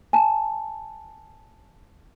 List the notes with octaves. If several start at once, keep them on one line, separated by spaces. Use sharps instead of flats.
G#5 A5